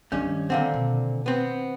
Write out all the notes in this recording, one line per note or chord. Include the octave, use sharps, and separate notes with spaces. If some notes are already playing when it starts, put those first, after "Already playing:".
G2 D#3 F3 A3 C#4 D4
A#2 D3 F3 C4 F5 F#5
B2
B3 C4